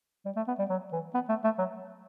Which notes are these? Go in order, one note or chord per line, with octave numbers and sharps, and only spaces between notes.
G3
A3
B3
G3
F#3
E3
B3
A3
A3
F#3